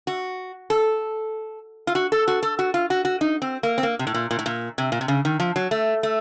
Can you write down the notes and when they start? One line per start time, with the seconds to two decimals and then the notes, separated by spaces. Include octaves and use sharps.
0.07 F#4
0.70 A4
1.87 F4
1.95 F#4
2.12 A4
2.28 F#4
2.43 A4
2.59 F#4
2.74 F4
2.90 F#4
3.05 F#4
3.21 D#4
3.42 C4
3.63 A#3
3.78 C4
3.83 A#3
3.99 C3
4.07 A2
4.14 A#2
4.31 A#2
4.39 A2
4.46 A#2
4.78 C3
4.92 A#2
5.01 C3
5.08 C#3
5.25 D#3
5.40 F3
5.56 F#3
5.71 A3
6.03 A3